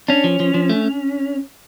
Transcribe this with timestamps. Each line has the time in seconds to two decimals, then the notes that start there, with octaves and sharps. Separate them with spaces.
0.08 C#4 D4
0.24 F3
0.40 F3
0.54 F3
0.70 A3